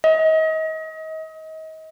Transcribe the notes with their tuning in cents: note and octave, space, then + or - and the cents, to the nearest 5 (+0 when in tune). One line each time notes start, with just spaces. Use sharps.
D#5 +35